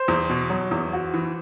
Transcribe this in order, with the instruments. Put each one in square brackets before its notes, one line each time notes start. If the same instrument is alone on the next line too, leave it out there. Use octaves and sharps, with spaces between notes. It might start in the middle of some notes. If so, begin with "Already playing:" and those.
Already playing: [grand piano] C5
[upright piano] E2
B2
F#3
E2
F#4
E3